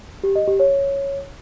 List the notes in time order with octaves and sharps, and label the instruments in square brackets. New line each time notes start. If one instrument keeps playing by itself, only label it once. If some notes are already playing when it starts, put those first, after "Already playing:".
[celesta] G4
D#5
G4
C#5